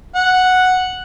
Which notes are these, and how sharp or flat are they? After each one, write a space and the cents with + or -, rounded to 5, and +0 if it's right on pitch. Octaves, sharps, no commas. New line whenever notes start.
F#5 -5